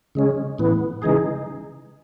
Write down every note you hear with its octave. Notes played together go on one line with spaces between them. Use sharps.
C#3 G#3 C#4
A2 E3 B3
C#3 E3 G#3 D#4 G#4